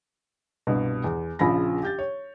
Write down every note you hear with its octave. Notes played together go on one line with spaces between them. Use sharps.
C2 G2 B2
E2
A#1 C#3 F3 F4 B5 A#6
G4 G6 A6
C#5